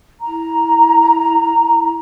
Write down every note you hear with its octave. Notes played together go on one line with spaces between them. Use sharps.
E4 A#5